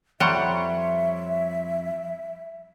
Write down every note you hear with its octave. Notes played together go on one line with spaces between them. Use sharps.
F2 G3 C#5 E5 F#5 A#5 C6 C#6